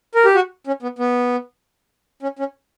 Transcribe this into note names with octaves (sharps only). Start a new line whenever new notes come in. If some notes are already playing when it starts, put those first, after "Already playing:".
A#4
G4
F#4
C#4
B3
B3
C#4
C#4